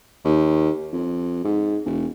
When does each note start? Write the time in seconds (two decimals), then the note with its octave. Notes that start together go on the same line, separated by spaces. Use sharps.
0.25 D#2
0.93 F2
1.44 G#2
1.86 E1